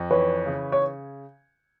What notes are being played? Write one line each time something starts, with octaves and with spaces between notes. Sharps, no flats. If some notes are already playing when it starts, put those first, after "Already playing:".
Already playing: F2
E3 B4 C#5
C#3
C#5